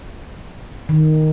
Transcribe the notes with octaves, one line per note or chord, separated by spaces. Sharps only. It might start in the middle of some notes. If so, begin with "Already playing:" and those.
D#3